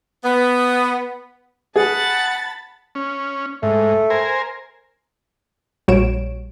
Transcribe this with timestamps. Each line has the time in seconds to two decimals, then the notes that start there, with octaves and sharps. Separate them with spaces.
0.24 B3
1.76 G#4 F#5 A5 B5 A6
2.95 C#4
3.63 G#2 A3
4.10 A#4 C5 G#5
5.88 A#1 G3 F#4 C#5 D7 E7